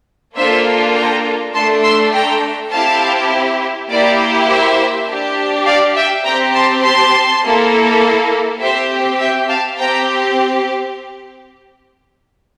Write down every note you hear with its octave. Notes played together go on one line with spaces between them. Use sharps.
A#3 D4 F4 A4 C5 E5
G5 A#5
A3 D4 A4 A5 C6
C6 E6
G5 A#5
C4 E4 G4 F5 A5
A#3 E4 G4 D5
C5 E5
D4 G4
D5 F5
E5 G5
C4 G4 G5 A#5
A5 C6
A5 C6
A#3 E4 A4
C4 G4 C5 E5
E5 G5
F5 A5
C4 G4 G5 A#5